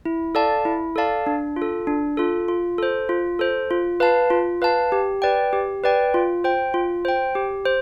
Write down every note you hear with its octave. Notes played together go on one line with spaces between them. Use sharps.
E4
A4 D5 F5 A5
E4
A4 D5 F5 A5
D4
F4
A4
D4
F4 A4
F4
A4 C5
F4
A4 C5
F4
B4 F5 A5
F4
B4 F5 A5
G4
B4 D5 G5
G4
B4 D5 G5
F4
C5 G5
F4
C5 G5
G4
C5